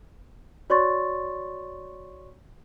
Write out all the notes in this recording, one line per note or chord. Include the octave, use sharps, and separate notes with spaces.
F#4 C#5 D5 C6 C#6 A6